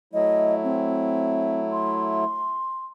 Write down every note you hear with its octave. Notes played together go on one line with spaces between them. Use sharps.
F#3 A3 E4 D#5
C4
C6